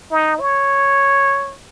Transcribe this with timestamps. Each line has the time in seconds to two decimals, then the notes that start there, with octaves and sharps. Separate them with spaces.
0.11 D#4
0.40 C#5